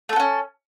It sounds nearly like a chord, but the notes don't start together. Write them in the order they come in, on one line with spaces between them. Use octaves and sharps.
A3 A4 B3 C#4